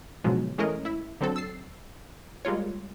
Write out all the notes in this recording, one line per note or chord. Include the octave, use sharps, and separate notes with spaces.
G#2 B2 D3 F3 F#3 G#3
E3 G#3 A3 C#4 A#4 D#5
E4 E5
D3 F#3 C4 A4
E6 A6 C7
G3 G#3 A#3 F4 C#5